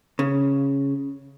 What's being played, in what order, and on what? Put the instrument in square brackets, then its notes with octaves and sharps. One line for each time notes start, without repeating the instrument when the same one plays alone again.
[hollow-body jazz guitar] C#3